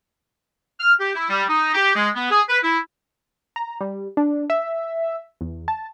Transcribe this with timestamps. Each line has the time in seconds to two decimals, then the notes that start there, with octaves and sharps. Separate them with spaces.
0.79 F6
1.00 G4
1.15 E4
1.29 G3
1.48 D#4
1.74 G4
1.94 G#3
2.15 B3
2.31 G#4
2.49 B4
2.63 E4
3.56 A#5
3.81 G3
4.17 D4
4.50 E5
5.41 E2
5.68 A5